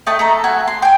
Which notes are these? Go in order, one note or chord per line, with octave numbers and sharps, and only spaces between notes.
A3 D#5 G5 A5
A3 A4 A#5
F#4 G#5
C6
G5 G#5